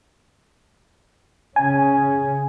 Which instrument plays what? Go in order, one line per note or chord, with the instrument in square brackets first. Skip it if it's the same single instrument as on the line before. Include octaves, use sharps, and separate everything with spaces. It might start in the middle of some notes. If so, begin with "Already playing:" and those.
[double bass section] C#3 C#4 [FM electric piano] G#5